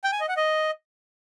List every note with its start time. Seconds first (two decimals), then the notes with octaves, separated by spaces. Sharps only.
0.04 G5
0.12 G#5
0.20 D#5
0.29 F#5
0.37 D#5